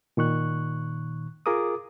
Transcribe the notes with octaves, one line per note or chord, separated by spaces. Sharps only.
A#2 D#3 C#6 F#6
F4 G#4 A#4 D6 D#6